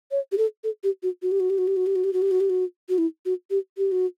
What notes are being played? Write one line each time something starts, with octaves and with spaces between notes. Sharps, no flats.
C#5
G4
A4
A4
G4
F#4
F#4
G4
F#4
G4
F#4
G4
F#4
G4
F#4
G4
F#4
G4
F#4
G4
F#4
F#4
E4
F#4
G4
G4
F#4